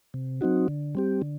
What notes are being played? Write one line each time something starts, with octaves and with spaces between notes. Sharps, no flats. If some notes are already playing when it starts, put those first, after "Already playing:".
C3
F#3 C4 D#4 F#4
D3
G3 C4 G4
D3